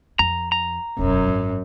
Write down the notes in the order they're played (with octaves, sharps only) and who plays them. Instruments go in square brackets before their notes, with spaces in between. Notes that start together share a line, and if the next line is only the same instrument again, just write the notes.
[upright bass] F2 [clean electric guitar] A#5
[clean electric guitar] A#5
[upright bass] E1 B1 [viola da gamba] F#2
[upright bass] G#1